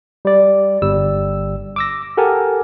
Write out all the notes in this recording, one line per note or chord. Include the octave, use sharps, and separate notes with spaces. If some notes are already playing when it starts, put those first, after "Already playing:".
G3 D5
G1 G3 E6
D6 E6 A#6
G4 A4 A#4 F#5 G#5 A5